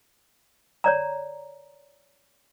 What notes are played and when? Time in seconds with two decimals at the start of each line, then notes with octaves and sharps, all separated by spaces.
0.84 C#5 D5 A#5